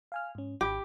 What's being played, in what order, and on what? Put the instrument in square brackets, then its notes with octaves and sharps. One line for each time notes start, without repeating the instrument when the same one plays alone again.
[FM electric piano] F5 G#5 F6
G#2 C#4
[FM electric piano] G#1 B5 [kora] G4